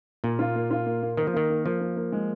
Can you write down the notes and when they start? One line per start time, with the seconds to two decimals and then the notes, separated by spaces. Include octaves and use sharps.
0.24 A#2 A#3
0.39 F4
0.55 A#3
0.71 F4
0.86 A#3
1.03 A#3
1.17 D#3 A#4
1.27 F3
1.34 D#3 A#3
1.50 A#3
1.65 F3 A#3
1.81 A#3
1.97 A#3
2.12 G#3